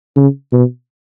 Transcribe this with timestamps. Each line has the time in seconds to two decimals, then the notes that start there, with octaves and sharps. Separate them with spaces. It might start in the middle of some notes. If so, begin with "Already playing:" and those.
0.16 C#3
0.53 B2